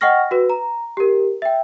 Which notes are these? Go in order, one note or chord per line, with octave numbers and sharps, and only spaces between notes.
D#5 F#5 G5 C#6 F6 A#6
F#4 B4
A#5
G4 A#4
E5 G5